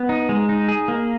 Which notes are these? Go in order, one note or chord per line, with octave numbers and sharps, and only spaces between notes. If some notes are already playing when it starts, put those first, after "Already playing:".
Already playing: B3
D#4
G#3
D#4
G#4
A#3